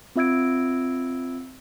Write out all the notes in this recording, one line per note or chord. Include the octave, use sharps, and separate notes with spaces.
C4 F4 E5 E6 G#6 D7